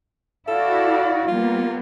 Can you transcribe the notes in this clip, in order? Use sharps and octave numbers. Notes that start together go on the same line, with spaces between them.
E4 F#4 A4 D5 F5
G3 A#3 B3 F4